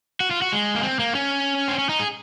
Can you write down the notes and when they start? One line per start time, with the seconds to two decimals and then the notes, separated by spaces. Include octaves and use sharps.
0.20 F#4
0.31 F4
0.42 F#4
0.53 G#3
0.75 A#3
0.83 C4
0.99 A#3
1.15 C#4
1.68 C4
1.79 C#4
1.89 D#4
2.00 G#4